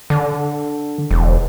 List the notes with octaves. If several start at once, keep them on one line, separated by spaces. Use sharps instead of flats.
D3
E1